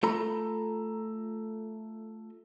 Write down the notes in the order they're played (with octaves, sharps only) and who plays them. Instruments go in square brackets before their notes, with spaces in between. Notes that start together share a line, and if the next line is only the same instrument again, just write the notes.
[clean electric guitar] A3 F4 A4 A#5 B5